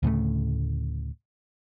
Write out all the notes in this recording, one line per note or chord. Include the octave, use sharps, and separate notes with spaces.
D2 A2 C#3 A3